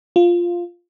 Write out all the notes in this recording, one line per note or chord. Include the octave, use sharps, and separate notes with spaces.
F4